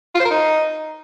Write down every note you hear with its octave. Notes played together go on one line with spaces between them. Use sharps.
F4
C5
A#4
D#4